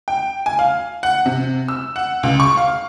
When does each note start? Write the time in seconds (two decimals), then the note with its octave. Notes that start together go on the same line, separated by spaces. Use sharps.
0.08 G5
0.46 G#5
0.59 F5
1.03 F#5
1.26 C3
1.68 E6
1.96 F#5
2.23 C#2
2.40 C#6
2.57 F5